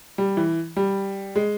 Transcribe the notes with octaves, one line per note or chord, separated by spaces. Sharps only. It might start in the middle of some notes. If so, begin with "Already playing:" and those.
G3
E3
G3
G#3